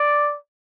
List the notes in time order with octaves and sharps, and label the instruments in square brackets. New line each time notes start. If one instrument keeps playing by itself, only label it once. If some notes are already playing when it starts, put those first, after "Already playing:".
Already playing: [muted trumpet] D5